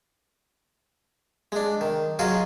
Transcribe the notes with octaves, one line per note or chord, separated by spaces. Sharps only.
G#3 D4
D#3
F#3 F4 F#4 G#4 D#5